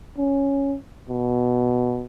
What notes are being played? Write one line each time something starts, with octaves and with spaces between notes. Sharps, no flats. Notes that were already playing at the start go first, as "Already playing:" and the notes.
C#4
B2